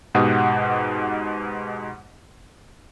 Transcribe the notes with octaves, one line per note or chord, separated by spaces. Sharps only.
G#2 B2 G4 F#5 D#6